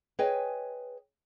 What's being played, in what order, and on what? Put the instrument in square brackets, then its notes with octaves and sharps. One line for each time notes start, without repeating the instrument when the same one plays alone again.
[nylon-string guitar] G#4 B4 C#5 D#5 G5 G#5